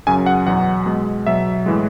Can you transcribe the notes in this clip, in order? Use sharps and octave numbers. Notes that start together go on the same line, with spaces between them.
F#2 C#3 F#3 G#5
F#5
E2 B2 F#3 F#5
B2 G#3
B2 F#3 E5
A2 E3 G#3